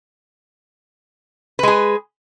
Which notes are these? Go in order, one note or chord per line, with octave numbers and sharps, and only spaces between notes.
G#3 G#4 B4